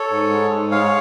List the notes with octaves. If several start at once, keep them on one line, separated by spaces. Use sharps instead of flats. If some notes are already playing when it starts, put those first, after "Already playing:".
Already playing: A4 C#5
G#2
G#3
G#2
G#3 C#5 F5